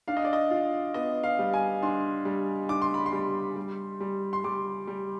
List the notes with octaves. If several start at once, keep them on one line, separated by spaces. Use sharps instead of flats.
D4 F5
D#5
D5
D#5
F4
B3 D#5
F5
G3
G#5
D4 C6
G3
D4 D6
C6
B5
C6
G3
G3
G3
C6
G3 D6
G3